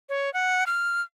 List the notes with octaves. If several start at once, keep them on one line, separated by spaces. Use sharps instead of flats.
C#5
F#5
F6